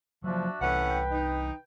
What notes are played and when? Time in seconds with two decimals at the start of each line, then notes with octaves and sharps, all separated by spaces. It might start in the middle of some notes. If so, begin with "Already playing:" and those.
0.24 F3 F#3 A#3 D4 F#4 E5
0.61 C2 A2 E3 C#4 B4 F#5
0.86 G5
1.12 D#4